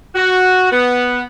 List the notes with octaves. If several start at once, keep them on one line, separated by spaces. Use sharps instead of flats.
F#4
B3